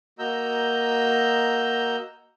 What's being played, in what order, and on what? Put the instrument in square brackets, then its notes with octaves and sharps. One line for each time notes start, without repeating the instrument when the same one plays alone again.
[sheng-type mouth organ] A#3 F#4 D#5 A#5 E6 G6